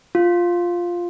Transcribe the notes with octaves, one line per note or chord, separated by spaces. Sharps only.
F4